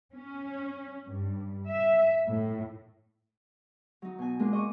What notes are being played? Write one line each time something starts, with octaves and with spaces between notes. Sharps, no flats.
C#4
G2
E5
A2
F#3 D#4
B2 G#5
G#3 A#3 D4 F4
D#5 C#6 D6